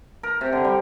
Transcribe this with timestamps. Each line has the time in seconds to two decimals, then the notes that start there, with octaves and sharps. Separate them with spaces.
0.23 A#4
0.41 C3
0.53 D3
0.65 G3